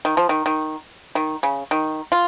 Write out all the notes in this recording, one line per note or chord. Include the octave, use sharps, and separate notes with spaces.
D#3
F3
D#3
D#3
D#3
C#3
D#3
F4